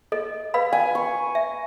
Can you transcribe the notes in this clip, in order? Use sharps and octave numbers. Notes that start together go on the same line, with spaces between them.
A4 D#5
B4 F5 B5
F5 G#5
C#6
E5